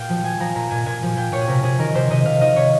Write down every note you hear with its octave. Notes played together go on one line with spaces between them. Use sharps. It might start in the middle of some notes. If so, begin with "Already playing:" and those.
Already playing: A#2 F5 G5
F3
F3 G#5
F3 A#5
A#2 A#5
A#2 G#5
A#2 G#5
F3
A#2 G5
A#2 C#5
G#4
C3 A#4
C3 G#4
D#3 A#4
C3 C5
C3 D#5
C3 F5
D#3 D#5
C3 C#5